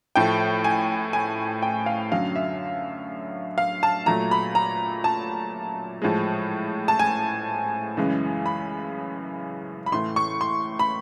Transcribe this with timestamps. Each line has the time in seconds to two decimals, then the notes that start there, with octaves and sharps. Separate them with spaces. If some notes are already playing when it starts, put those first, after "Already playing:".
0.16 A2 F3 A3 G5
0.64 G#5
1.13 G#5
1.62 G5
1.86 F5
2.12 F#2 D3 F#3 F5
2.36 E5
3.58 F5
3.83 A5
4.06 A#2 F#3 A3 A#5
4.31 B5
4.55 A#5
5.04 A5
6.02 A2 F3 G#3
6.88 A5
6.99 G#5
7.97 F#2 C#3 E3 G#3
8.46 B5
9.86 B5
9.92 A2 E3 A3 C6
10.16 C#6
10.41 C6
10.79 B5